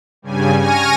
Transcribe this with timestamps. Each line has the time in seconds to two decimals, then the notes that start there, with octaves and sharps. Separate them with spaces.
0.22 G2 C#3 G3 G#5
0.61 G#5 C#6 F6 A#6 D#7